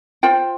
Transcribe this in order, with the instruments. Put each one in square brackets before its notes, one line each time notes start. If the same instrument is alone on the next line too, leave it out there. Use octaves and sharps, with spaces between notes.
[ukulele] F4 C5 G5